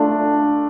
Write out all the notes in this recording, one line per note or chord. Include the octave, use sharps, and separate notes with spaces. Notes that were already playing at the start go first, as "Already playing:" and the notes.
Already playing: A3 D4 F4